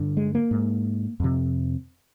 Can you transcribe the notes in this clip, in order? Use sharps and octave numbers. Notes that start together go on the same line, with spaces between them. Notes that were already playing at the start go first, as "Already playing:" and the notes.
Already playing: G2 D3
G#3
A#3
G#2
F2 C3